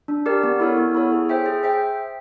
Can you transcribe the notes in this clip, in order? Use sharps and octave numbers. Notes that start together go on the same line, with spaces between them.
D4
G4 A#4 D5
B3
E4 A4 C#5
B3
E4 A4 C#5
G#4
C5 E5 G5
G#4
C5 E5 G5